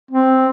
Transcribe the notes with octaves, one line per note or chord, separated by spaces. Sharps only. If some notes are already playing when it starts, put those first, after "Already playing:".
C4